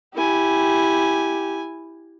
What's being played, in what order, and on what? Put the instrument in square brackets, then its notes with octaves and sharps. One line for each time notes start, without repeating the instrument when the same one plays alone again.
[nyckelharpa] E4 G#5 [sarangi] G4